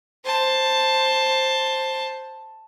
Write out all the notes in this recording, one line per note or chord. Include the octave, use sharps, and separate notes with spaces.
C5 A5